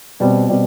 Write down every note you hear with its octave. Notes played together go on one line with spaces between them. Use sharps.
B2 G3 C4
B2 G3 C4